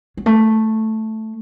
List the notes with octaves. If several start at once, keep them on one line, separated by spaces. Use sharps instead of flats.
F#3
A3